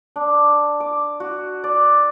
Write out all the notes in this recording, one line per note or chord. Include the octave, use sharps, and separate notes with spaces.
D4
D6
F#4
D5